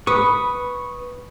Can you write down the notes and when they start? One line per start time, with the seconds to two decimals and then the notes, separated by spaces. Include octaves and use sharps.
0.07 B4 C#6 D#6